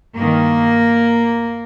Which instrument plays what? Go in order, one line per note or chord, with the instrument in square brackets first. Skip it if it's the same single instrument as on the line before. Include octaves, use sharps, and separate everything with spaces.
[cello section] G2 D#3 A#3